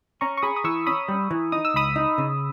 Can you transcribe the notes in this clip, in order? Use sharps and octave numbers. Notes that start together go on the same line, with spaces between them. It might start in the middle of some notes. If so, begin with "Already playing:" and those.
C#4 A#5 C#6
C#6
G#4 B5 D#6
D#6
E3 C#6 E6
C#4 B5 D#6
G3
E3
D#4 D#6
E6
C#2 B5 D#6
D#4
C#3